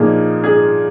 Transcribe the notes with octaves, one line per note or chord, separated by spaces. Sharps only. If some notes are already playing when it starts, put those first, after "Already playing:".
Already playing: A#2 F3 A#3 D#4 G#4
G#4